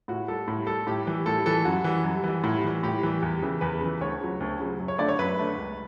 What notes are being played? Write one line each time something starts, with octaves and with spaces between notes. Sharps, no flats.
A2 F#4
G3 A4
A2
G3 A4
A2 G4
E3 G3
A2 A4
E3 G3 A4
F#2 F#4
E3 G3
F#2
E3 G3
A2
E3 G3
A2 G4
E3 G3
E2
C#3 E3
E2 B4
C#3 E3
D2 C#5
C#3 F#3
D2
C#3 F#3
F#2
C#5
D3 A3 D5
C#5
F#2 B4
D3 A3
C#2